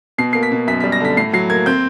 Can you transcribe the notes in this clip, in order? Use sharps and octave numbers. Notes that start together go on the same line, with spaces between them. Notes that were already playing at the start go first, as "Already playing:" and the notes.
B2 C7
A#3 C7
B6
B2
F#2 B6
G3 B6
A#6
D3 B6
A2 C7
F#3 C7
A#3 G#6
C4 G6